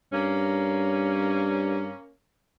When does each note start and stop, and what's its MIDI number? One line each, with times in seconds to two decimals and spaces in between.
0.12 1.92 43
0.12 2.12 58
0.12 2.12 61